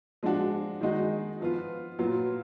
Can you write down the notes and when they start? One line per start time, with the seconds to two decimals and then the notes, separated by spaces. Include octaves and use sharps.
0.23 F3 G#3 D4 F#4
0.81 D#3 G#3 D#4 F#4
1.40 F3 B3 F4
1.99 A#2 F#3 B3 F4